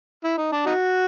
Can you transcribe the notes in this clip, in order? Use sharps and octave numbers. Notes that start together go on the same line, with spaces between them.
E4
D#4
D4
D#4 F#4